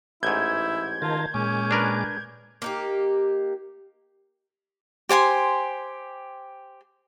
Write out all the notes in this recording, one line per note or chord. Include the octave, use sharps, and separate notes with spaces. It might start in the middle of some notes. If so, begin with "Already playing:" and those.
A1 G#2 E4 G6 G#6
D#3 F4 A#4 A5
A#2 G#3 C#4 D6
D4 A#4 B4
A#3 D#4 G4
G4 C5 G#5 C6